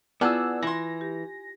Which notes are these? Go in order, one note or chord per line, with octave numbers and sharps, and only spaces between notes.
B3 E4 F4 G#4 D5 F#5 A5 E6
E3 G#5 C6 A#6
G4